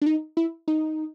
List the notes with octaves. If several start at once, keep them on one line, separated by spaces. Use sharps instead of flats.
D4
D#4
E4
D#4